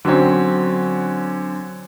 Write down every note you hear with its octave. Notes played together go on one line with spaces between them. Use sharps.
D3 F#3 C4 C#4